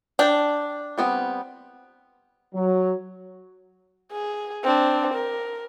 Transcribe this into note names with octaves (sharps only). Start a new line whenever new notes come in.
D4 G5
G3 B3 C4
F#3
G#4
C4 D4
A#4